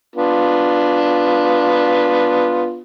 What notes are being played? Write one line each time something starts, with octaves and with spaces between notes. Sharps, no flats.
B3 D4 F4